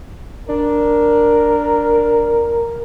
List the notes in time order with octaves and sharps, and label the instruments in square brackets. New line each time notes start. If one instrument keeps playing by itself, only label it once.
[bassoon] D4 [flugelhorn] A#4